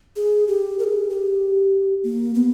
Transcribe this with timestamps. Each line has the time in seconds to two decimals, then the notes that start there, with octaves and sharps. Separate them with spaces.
0.16 G#4
0.48 G4
0.79 A#4
0.84 G#4
1.10 G4
2.03 A#3
2.35 B3